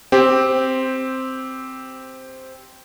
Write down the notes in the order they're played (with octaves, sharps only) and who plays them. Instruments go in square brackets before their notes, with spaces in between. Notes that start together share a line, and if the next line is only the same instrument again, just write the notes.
[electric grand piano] C4 G4